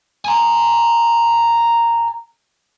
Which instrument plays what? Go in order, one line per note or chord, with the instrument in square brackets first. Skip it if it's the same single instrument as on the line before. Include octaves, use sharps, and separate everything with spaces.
[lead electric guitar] G#5 A#5